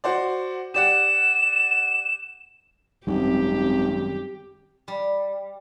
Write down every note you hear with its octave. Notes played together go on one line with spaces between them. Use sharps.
F#4 C5 D5
G4 D5 F#5 E7
G#1 F#2 D#3 G3 C4 G4
G3